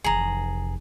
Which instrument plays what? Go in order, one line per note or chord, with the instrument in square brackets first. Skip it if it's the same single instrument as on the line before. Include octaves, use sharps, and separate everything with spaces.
[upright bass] F1 E3 [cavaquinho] G#4 A#5